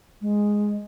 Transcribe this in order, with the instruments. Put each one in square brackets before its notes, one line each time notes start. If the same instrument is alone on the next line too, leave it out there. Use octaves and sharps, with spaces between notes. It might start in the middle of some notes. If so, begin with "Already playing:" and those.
[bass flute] G#3